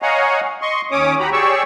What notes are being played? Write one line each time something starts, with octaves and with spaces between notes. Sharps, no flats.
C#5 D#5 F5 F#5 G#5 A#5
D#5 C6 C#6
D#2 C#4 C#5 D6 D#6
F#4 G4 A#5 B5
G4 G#4 C#5 D5 C#6 E6